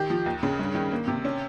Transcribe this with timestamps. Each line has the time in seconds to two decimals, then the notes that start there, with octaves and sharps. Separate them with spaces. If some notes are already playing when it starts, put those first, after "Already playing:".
Already playing: D#3 G4
0.10 F3
0.26 D#2
0.43 C#3
0.59 G2
0.75 D#3
0.92 A#3
1.07 C3
1.25 C#4